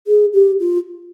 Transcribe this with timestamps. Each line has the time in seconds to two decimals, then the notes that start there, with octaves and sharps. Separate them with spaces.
0.07 G#4
0.33 G4
0.60 F4